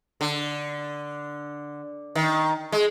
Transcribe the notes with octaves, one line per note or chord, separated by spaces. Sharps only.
D3
D#3
G#3